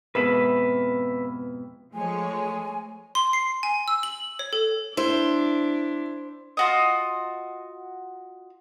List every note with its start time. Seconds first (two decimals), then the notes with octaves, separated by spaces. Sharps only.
0.15 F2 G#2 B2 B4 E5 B5
1.94 F3 G#3 A3 C#5 G#5
3.15 C6
3.33 C7
3.63 G#5
3.88 E6
4.03 F#7
4.39 C#5
4.53 A4
4.97 D4 E4 C5
6.57 F4 F#4 D#5